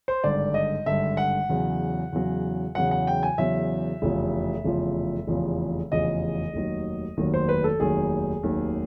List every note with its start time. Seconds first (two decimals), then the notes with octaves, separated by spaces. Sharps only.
0.08 C5
0.24 G#1 G2 D3 D5
0.54 D#5
0.86 G#1 G2 D3 E5
1.17 F#5
1.49 E2 C#3 F#3
2.13 E2 C#3 F#3
2.75 E2 C#3 F#3 F#5
2.91 F#5
3.07 G5
3.23 G#5
3.38 E2 C#3 F#3 E5
4.02 F1 E2 C#3 F3
4.65 F1 E2 C#3 F3
5.27 F1 E2 C#3 F3
5.91 F1 E2 C#3 F3 D#5
6.54 F1 D#2 D#3 F#3
7.17 F1 D#2 D#3 F#3
7.34 C5
7.49 B4
7.64 A4
7.80 F1 D#2 D#3 F#3 G#4
8.43 F1 D#2 D#3 F#3